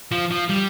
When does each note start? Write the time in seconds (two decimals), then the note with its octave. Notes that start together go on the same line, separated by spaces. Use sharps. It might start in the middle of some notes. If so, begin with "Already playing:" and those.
0.11 F3
0.31 F3
0.49 G3